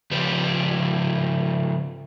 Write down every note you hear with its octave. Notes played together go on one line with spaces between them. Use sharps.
C#3 F3 G4 B4